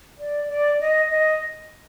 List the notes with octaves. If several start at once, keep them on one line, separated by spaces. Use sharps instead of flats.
D5
D5
D#5
D#5